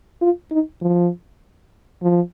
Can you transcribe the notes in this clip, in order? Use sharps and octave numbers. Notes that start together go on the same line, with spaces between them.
F4
D#4
F3
F3